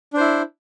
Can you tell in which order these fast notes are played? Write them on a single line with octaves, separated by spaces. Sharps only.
D4 C5 E4